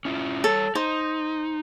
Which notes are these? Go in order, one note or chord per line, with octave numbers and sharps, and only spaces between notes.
C#4 E4 F4
G3 A4 C#5
D#4 C5